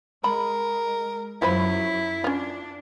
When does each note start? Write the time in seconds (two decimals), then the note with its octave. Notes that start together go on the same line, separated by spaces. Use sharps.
0.24 G#3 A#4 B5
1.42 F#2 F#3 E4 F4 C5 B5
2.24 C#4 D4 F4